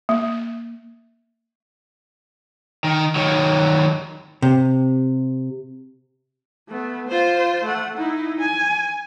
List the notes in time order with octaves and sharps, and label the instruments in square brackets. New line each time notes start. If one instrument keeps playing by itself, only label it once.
[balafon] A#3
[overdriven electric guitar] D#3
D#3 F#3
[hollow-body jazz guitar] C3
[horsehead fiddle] A3 B3
F4 C5
A3 F#5
D#4 E4
G#5